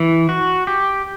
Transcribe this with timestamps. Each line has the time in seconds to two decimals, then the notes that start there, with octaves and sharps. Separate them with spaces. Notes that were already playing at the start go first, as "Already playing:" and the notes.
Already playing: E3
0.29 F#4
0.67 G4